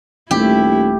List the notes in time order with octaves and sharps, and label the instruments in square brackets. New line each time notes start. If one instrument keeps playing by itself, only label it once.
[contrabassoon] D#1 [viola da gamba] A3 E4 [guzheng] G4